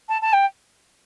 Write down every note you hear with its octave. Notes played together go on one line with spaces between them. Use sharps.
A5
A5
G5